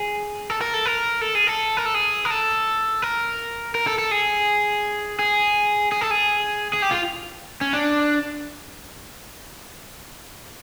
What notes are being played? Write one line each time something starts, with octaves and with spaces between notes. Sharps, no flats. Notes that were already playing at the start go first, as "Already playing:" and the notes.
Already playing: G#4
A4
A#4
A4
A#4
A4
G#4
A4
A#4
A4
G#4
A#4
A4
A#4
A#4
A4
A4
G#4
G#4
G#4
A4
G#4
G#4
G4
F4
C#4
D4